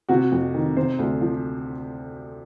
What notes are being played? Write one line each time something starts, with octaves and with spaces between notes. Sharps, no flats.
C3 F#4
F2
D#3
C3 C5
D2
F3